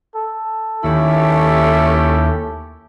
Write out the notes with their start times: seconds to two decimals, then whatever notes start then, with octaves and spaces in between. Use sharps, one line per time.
0.15 A4
0.84 D#2 A3 C#4 E4 G4